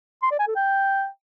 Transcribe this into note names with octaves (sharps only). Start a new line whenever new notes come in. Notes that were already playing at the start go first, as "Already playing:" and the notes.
C6
D5
G#5
A4
G5